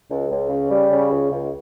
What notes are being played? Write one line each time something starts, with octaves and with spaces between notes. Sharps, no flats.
C#2
C#2
C#3
G3
C#3
C#2
C#2